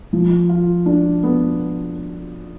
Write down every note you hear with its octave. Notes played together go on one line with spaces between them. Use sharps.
F3
F4
D4
B3